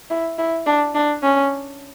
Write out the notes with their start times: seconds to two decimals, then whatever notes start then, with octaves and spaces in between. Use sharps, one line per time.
0.10 E4
0.38 E4
0.66 D4
0.95 D4
1.23 C#4